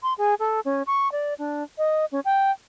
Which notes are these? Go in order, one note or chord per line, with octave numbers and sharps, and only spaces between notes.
C6
G#4
A4
C#4
C#6
D5
D4
D#5
C#4
G5